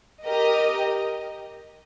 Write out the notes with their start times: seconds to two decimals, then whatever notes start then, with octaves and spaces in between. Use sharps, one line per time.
0.25 G4 A#4 D#5